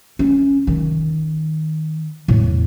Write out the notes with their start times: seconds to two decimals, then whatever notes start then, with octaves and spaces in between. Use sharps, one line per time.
0.19 C#4
0.67 D#3
2.28 E2 A2